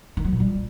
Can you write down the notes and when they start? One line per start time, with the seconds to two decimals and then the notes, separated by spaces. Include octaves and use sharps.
0.17 D#3
0.25 F#3
0.32 A#2
0.40 G3